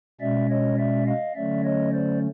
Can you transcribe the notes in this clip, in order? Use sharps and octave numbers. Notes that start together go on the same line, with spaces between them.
B2 G#3 C#4 D5 E5
C#5 D#5
D5 E5
D#5 F5
D3 F#3 A3 C#4 D5 E5
C#5 D#5
C5 D5